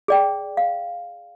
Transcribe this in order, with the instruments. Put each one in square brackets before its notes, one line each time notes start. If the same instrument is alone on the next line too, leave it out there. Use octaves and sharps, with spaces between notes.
[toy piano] G#4 D5 G5
F5